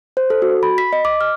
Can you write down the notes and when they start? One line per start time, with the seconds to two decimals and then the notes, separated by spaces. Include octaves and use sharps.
0.17 C5
0.30 A4
0.42 F#4
0.63 B5
0.78 B6
0.93 D#5
1.05 D6
1.21 F6